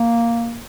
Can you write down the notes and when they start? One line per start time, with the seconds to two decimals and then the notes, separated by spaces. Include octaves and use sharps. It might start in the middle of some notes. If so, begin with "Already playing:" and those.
Already playing: A#3